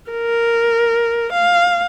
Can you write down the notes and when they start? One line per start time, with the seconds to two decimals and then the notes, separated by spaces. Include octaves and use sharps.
0.11 A#4
1.33 F5